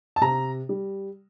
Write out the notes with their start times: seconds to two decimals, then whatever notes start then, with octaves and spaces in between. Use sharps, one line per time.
0.16 A5
0.21 C3 A#5
0.69 G3